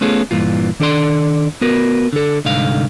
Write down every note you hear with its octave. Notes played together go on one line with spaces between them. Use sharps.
A3 B3 C#4 F4 G#4 A4
G2 A#2 E3 F4
D#3 D4 A4 D5 C6
B3 F#4 A#4 B4
D3 A4
C2 G#2 D3 D#4 F5